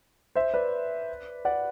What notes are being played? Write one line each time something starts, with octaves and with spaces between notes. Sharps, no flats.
C5 E5
B4 D5
D5 F#5